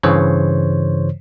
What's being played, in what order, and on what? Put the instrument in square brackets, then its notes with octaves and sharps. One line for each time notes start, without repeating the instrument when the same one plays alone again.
[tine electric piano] G2 C#3 E3 C5 C#5